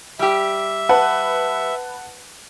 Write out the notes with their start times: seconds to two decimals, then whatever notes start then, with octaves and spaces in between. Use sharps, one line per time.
0.19 G3 G4 E5
0.89 B4 F#5 A5